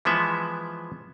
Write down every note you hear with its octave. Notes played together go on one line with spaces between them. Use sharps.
E3 F3 G#3 B3 E5